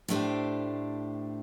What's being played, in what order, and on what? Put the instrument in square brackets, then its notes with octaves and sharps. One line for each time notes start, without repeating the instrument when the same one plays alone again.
[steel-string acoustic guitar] A2 A3 D4 G4 C5